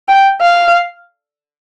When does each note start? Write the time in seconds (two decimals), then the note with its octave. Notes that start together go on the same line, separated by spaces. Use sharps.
0.08 G5
0.42 F5